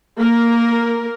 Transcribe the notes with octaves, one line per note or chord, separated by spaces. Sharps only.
A#3 A#4